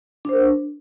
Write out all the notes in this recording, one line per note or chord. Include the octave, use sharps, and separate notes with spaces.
D4 A#4 C5